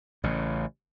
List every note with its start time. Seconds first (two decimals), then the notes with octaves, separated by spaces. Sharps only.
0.24 A1 C#3